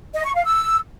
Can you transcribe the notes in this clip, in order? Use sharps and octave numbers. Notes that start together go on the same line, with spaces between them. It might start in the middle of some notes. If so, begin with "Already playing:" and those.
D#5
C#6
F5
E6